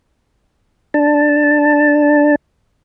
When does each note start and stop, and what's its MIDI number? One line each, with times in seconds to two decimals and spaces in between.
0.94 2.35 62
0.94 2.35 81